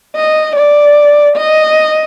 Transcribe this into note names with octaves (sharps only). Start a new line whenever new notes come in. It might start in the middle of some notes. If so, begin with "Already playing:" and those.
D#5
D5
D#5